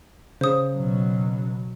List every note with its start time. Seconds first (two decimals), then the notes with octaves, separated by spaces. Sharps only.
0.41 C#3 C5 D#6
0.75 B2 F#3